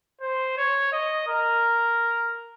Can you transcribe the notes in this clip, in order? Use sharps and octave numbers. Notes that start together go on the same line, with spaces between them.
C5
C#5
D#5
A#4